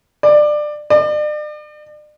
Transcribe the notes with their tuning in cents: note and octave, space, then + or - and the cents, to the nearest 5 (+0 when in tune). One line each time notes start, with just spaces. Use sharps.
D5 +20
D5 +40